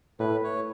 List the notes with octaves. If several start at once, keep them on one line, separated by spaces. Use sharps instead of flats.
A2 B4
C#5